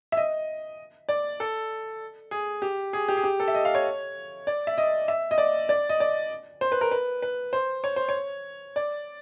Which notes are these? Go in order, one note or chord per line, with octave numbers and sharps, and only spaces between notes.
E5
D#5
D5
A4
G#4
G4
G#4
G4
G#4
G4
A4
E5
D#5
F5
C#5
D5
E5
D#5
E5
D#5
D5
D5
D#5
D5
C5
B4
A#4
B4
B4
C5
C#5
C5
C#5
D5